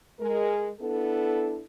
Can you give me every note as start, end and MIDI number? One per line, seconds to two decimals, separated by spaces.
0.20 0.70 56
0.20 0.70 70
0.80 1.62 59
0.80 1.62 62
0.80 1.62 64
0.80 1.62 69